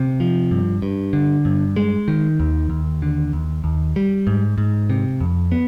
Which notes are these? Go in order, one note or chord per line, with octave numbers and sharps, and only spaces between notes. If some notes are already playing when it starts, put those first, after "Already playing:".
Already playing: C3
F3
G2
G2
D3
G2
G#3
D#3
D#2
D#2
D3
D#2
D#2
G3
G#2
G#2
C3
F2
B3